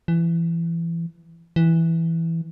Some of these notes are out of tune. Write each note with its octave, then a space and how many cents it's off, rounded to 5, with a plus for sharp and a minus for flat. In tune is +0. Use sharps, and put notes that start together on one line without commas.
E3 +25
E3 +0